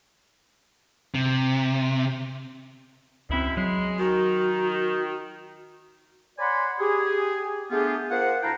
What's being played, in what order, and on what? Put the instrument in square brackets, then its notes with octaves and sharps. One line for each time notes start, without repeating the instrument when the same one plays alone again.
[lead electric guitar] C3
[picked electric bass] C#2 C4 [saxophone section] F#2 B2 E4
[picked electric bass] F#3 [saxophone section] G#3
[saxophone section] D#3 [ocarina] F#4
[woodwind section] C#5 D5 F#5 G#5 B5 C6
G4 G#4
A3 B3 D4 F4 G4 G#4
F4 A#4 C5 F#5
D2 E4 F5 G5 A5 A#5